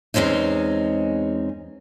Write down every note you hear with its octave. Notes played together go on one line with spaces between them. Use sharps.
E2 G#3 C4 C#4 D#4